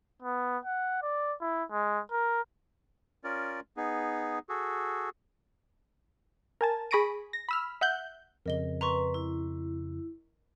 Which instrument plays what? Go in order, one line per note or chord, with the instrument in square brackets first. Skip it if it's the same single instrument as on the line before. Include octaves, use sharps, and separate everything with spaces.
[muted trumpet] B3
F#5
D5
E4
G#3
A#4
[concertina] C#4 F4 A#4 D5
B3 D#4 G#4
F#4 G#4 A4
[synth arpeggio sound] A#4 G#5 A5
G#4 B5 C#6 A#6 D7 D#7
A#6
B5 E6 F6
E5 F#5 F#6 G6
[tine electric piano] F2 C#3 [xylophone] A#4 D#5 G7
[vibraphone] B4 [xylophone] A#5 C6 C#6
[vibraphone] E4